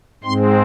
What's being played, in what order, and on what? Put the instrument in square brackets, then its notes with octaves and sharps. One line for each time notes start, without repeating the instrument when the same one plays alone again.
[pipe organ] G#2 G#3 C4 C6